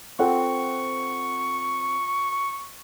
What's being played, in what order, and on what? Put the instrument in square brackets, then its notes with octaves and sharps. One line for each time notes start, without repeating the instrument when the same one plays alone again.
[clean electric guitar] C4 [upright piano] F4 A4 F#5 [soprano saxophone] C#6